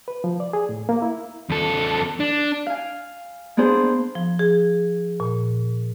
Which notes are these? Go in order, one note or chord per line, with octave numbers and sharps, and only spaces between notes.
B4
F3
D5
G#4
A2
A#3
E4
E2 A4
D4
F5 G#5
A#3 B3 D4 G#4 C5
F3
G#4
A#2